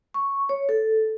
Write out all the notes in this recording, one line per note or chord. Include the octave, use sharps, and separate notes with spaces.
C#6
C#5
A4